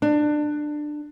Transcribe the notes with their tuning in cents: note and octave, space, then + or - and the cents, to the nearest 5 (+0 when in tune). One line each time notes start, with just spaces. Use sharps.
D4 +20